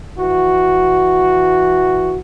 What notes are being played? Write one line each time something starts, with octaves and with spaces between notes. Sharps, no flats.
E3 F#4